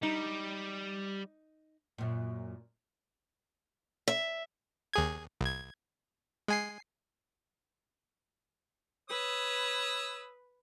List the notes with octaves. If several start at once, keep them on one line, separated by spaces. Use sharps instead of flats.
G3 D#4
F#2 A#2
E5
D#2 G#4 G#6
C2 G#6
G#3 G#5 C7
B4 C#5 D#6 E6